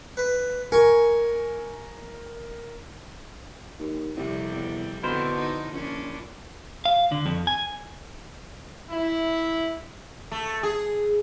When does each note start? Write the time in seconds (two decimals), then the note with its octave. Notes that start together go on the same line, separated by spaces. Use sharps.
0.17 B4
0.72 A#4 G#5 C#6
3.79 D#2
4.16 C2 F2 C3 G3
4.51 E2
5.03 B2 D3 C4 E4 A#4 C5
5.39 D#4
5.73 A#1 C#4 D4
6.85 F5
7.12 D3
7.26 F2
7.47 G#5
8.90 E4
10.32 A3
10.63 G#4